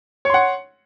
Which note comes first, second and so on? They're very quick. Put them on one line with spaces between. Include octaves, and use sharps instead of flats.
C#5 C6 F#5